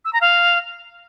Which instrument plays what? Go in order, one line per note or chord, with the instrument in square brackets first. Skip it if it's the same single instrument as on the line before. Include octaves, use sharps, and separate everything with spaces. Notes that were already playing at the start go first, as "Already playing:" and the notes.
[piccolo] E6
A#5
F5